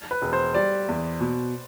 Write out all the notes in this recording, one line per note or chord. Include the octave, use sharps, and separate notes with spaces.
B4
E1
C5
G3 D5
E2
B2